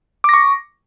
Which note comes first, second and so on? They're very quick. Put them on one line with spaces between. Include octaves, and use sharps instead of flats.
D6 A#6 C#6